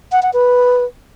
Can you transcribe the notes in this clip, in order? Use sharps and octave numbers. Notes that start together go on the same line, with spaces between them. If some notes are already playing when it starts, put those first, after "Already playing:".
F#5
F#5
B4